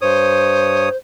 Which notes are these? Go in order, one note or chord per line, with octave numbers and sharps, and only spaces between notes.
G2 C5 C#5 D#6